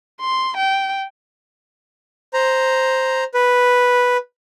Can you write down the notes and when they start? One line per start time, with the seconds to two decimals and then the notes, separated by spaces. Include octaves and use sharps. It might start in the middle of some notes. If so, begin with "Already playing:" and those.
0.20 C6
0.57 G5
2.33 C5 A#5
3.34 B4